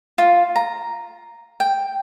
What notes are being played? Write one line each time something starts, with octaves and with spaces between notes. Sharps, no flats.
F4
A#5
G5